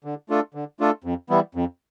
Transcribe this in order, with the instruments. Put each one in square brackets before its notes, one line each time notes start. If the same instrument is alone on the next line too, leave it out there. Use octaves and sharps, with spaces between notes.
[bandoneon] D3
A3 D4 F4 A4
D3
A3 D4 F4 A4
F2
E3 G3 B3 E4
F2